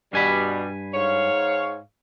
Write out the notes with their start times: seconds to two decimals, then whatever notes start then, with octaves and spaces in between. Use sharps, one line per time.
0.13 G2 B2 G3 G#5 B5
0.94 G#2 C#5 F5